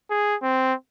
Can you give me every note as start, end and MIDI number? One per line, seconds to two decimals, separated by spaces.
0.10 0.35 68
0.42 0.74 60